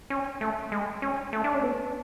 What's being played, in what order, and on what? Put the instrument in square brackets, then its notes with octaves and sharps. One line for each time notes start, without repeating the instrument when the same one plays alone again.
[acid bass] C#4
A3
G#3
C#4
A3
D4
C#4
B3